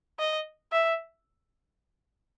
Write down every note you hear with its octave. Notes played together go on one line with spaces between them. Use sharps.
D#5
E5